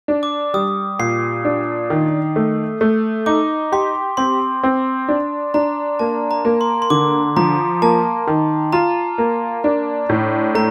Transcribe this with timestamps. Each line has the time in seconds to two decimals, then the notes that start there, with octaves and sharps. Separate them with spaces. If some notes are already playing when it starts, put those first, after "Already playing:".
0.08 D4
0.23 D6
0.54 G3 D#6
0.99 A#2 C7
1.45 D4
1.90 D#3
2.36 A3
2.81 A3
3.26 D#4 D6
3.72 G4 C6
4.17 C4 C6
4.63 C4
5.08 D4
5.54 D4 A#5
5.99 A#3 A5
6.31 A#5
6.45 A#3
6.61 C6
6.82 C6
6.90 D3 D6
7.37 F3 A#5
7.82 A#3 A5
8.27 D#3
8.73 F4 A#5
9.18 A#3
9.64 D4
10.09 A2
10.55 A3 A#5